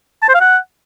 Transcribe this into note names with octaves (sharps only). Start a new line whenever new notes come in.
A5
C5
F5
F#5